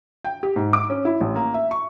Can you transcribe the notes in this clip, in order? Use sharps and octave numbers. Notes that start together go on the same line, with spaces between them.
G5
G4
G#2
D6
C#4
E4
A1
A#3
E5
C#6